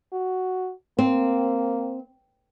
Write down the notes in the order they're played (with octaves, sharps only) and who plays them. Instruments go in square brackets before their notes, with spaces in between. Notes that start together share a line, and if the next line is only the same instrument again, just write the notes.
[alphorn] F#4
[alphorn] A#3 [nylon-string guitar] C4